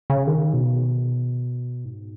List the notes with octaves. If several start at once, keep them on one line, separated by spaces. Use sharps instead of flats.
C#3
D#3
B2
G#2